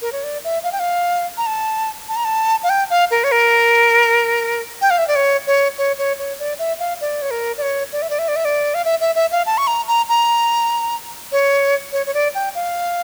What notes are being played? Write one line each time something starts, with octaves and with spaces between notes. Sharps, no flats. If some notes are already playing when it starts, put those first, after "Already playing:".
A#4
C#5
D5
E5
F5
G5
F5
A#5
A5
A5
A#5
A5
F5
G5
F5
A#4
C#5
A#4
G5
F5
E5
D5
C#5
C#5
C#5
C#5
C#5
D5
E5
F5
D5
C#5
A#4
D5
C#5
D5
E5
D5
E5
D5
E5
D5
F5
E5
E5
E5
F5
A5
C#6
A#5
A#5
A#5
C#5
C#5
C#5
D5
G5
F5